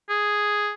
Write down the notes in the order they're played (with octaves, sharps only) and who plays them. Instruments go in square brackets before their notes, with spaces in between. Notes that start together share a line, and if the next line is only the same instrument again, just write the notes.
[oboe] G#4